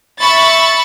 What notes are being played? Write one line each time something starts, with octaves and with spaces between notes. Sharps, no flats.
E5 B5 C#6 A6